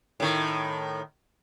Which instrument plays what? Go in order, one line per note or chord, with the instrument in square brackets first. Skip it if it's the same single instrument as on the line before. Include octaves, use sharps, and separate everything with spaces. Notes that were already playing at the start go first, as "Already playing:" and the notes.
[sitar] A2 D#3